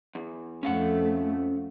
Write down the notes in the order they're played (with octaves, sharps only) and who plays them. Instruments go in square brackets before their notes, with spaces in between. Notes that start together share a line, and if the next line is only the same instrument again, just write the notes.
[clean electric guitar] E2
[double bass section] F2 A3 [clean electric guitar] C#4 F5 F#5